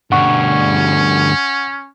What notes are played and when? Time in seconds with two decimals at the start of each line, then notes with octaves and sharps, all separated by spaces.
0.12 D2 G2 C#4 F#5 C#6